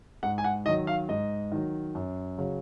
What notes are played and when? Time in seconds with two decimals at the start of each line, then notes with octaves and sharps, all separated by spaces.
0.23 G#2 F#5
0.38 G#5
0.44 F#5
0.66 D#3 D#5
0.68 F#3
0.87 F5
1.09 G#2 D#5
1.52 D#3 F#3
1.95 F#2
2.38 C#3 F#3